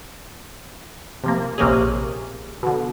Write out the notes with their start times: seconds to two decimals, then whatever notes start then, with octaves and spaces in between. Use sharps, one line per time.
1.24 C3 F3 A#3
1.58 A#1 C3 A#3 C#4 G#4
2.63 B2 D3